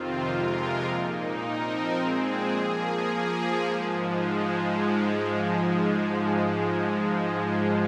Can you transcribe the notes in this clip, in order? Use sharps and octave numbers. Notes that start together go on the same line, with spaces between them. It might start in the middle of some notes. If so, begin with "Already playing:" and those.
Already playing: F2 C3 D#3 C4 F4
F2 C3 G#3 F4 A#4
A#2 A#3 D#4
F3 C4 D#4 A#4
A#2 G#3 C4 G#4
F3 A#3 G#4
F3 A#3 G#4
G#2 F3 G#3